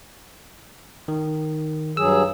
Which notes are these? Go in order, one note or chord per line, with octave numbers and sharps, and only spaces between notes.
D#3
G2 F#3 G#4 E6